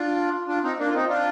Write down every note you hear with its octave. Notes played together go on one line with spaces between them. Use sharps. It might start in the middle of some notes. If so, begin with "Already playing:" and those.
Already playing: D4 F4
D4 F4
C4 D#4
A#3 D4
F4
C4 D#4
D4 F4